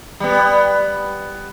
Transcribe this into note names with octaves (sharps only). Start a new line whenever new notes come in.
G3 B3